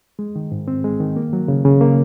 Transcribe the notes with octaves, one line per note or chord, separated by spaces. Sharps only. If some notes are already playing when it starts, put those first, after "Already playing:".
G#3
D#3
G#2
C4
G#3
D#3
A#3
F#3
C#3
C#3
A#3